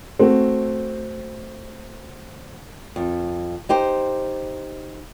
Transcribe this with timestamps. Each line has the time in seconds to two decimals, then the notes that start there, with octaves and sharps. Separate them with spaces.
0.19 A3 C4 F#4
2.96 F2
3.69 D#4 G4 C5